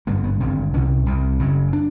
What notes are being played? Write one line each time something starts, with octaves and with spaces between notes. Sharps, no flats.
G#1 G2 D3 A#3
B3
G#1 G2 D3 C4
C2 C3 C#4
C2 C3
F#1 F#2 C#3
D4